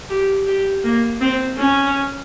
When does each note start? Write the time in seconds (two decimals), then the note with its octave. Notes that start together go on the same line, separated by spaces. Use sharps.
0.09 G4
0.46 G4
0.84 A#3
1.21 C4
1.58 C#4